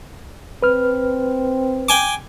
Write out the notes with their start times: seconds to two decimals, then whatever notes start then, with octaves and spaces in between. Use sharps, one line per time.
0.62 C4 B4 F6
1.89 G5 G#5 D6